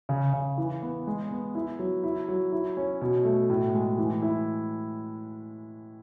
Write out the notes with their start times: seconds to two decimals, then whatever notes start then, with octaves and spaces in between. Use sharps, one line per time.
0.09 C#3
0.33 C#3
0.58 E3
0.82 B3
1.07 G#3
1.31 B3
1.55 E4
1.79 F#3
2.04 E4
2.28 F#3
2.53 E4
2.77 C#4
3.01 B2
3.25 A3
3.50 A2
3.74 G#3
3.98 E3
4.22 E4